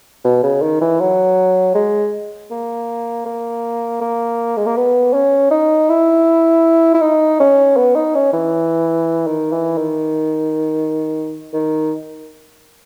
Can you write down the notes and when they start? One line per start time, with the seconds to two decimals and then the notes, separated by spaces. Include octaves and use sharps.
0.24 B2
0.43 C#3
0.62 D#3
0.81 E3
1.00 F#3
1.75 G#3
2.51 A#3
3.25 A#3
4.01 A#3
4.57 G#3
4.66 A#3
4.77 B3
5.14 C#4
5.51 D#4
5.89 E4
6.94 E4
7.01 D#4
7.40 C#4
7.77 B3
7.96 D#4
8.15 C#4
8.33 E3
9.27 D#3
9.52 E3
9.78 D#3
11.53 D#3